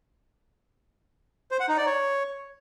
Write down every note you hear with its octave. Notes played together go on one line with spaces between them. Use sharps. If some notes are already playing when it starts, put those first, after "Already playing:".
C5
F#5
D#4
D5
C#5